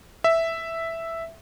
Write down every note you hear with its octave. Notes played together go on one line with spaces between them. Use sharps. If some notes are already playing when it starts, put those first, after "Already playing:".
E5